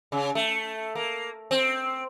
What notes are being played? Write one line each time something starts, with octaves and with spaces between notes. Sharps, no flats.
C#3
A3
A#3
C4